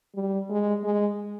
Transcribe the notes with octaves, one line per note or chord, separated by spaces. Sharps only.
G3
G#3
G#3